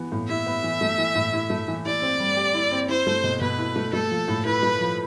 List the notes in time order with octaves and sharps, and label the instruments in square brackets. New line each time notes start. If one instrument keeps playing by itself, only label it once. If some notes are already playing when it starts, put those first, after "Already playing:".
Already playing: [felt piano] E3 B3
A2
[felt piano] E4 [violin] E5
[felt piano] B3
E3
A3
E3
A2
E4
A3
E3
[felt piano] E4 [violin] D5
[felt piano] C4
G3
G4
E4
C4
[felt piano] E4 [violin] C5
[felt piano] A3
B2
[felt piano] B2 [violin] B4
[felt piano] E4
A3
[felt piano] A3 [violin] A4
[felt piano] F3
A2
[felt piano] E4 [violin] B4
[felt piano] A3
F3